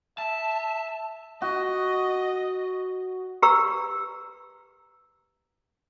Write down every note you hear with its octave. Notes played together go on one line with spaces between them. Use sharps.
E5 A5
F#4 D#5
G4 B4 A#5 C#6 E6